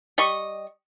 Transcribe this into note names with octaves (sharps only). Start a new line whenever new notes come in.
G3 D#5 C#6